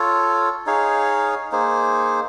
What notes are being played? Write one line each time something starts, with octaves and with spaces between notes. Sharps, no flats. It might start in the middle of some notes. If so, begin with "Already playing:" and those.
Already playing: F4 A4 C#5
D#4 G#4 C#5 F5
A#3 D#4 G#4 C5